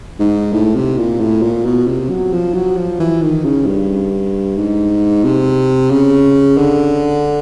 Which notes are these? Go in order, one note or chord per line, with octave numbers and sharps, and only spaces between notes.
G#2
A2
C3
A#2
A2
A#2
B2
C3
F#3
F3
F#3
F3
E3
D#3
C#3
G2
G#2
C3
C#3
D3